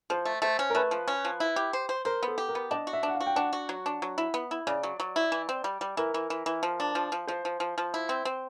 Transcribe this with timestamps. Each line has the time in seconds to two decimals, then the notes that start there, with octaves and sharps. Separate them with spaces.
0.10 F3 C5
0.25 A3
0.42 A3 C5
0.59 C#4
0.70 A#4
0.75 A3 B4
0.91 F3
1.08 C#4
1.25 F3
1.40 E4
1.56 G4
1.73 C5
1.89 C5
2.05 A#4 C5
2.23 B3
2.28 A4
2.38 G4
2.49 A#4
2.55 B3
2.71 D4 D#5
2.87 F#4
2.93 E5
3.03 D4
3.08 F#5
3.15 F5
3.21 F#4
3.26 G5
3.36 D4 F#5
3.53 F#4
3.69 F#3
3.86 D4
4.02 F#3
4.18 E4
4.34 B3
4.51 E4
4.67 C#3 D5
4.83 F#3
5.00 F#3
5.16 E4
5.32 E3
5.49 C4
5.64 G3
5.81 G3
5.97 E3 A#4
6.14 E3
6.30 E3
6.46 E3
6.63 F3
6.80 D4
6.95 F3
7.12 F3
7.27 F3 C5
7.45 F3
7.60 F3
7.78 F3
7.94 E4
8.09 C4
8.25 C4